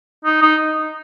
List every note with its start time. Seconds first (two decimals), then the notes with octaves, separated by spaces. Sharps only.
0.25 D#4
0.42 D#4